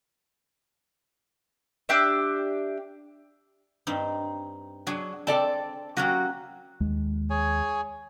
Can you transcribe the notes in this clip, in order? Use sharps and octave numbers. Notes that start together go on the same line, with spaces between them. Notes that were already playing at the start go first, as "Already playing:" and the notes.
D4 G4 E5
G2 C4 D#4
F#3 D4 G#4 G#5
C4 A4 D5 A5
F#3 A#3 C#4 F#4 G4
D#2 G#3
G#4 C#5 G#5